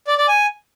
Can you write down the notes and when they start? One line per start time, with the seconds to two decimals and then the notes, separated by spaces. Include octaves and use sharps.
0.07 D5
0.18 D5
0.28 G#5